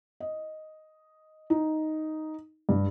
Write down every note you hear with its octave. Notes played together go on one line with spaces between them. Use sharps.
D#5
D#4
G2